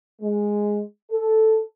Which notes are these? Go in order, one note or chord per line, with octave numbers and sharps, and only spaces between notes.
G#3
A4